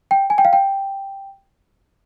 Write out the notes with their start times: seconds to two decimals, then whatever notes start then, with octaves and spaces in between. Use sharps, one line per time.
0.11 G5
0.30 G#5
0.38 G5
0.45 F5
0.53 G5